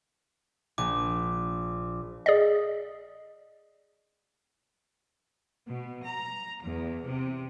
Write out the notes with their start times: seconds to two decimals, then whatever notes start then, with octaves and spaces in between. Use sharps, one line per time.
0.78 A#1 D6
2.26 G#4 D5 D#5
5.68 B2
6.06 A#5
6.63 E2
7.07 C3